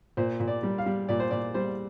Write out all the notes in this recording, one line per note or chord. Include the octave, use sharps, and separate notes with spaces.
A#2 C5
A#2
D5
G3
F5
G3
A#2 D5
C5
A#2 D5
G3 C5